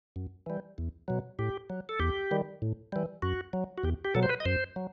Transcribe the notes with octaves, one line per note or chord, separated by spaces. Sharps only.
F#2
E3 G3
E2
B2 F#3
A2 G4
F#3
A4
E2 G4
D#3 G3
A2
E3 G3
F#2 F#4
F#3
F#4
E2 G4
G4
B2 F#3 A4
C5
B4
D#5
F#2 C5
F#3